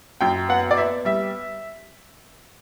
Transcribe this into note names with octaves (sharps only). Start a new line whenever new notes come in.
F#2 G5
B3 F#5
D5
B3 E5
G3 E5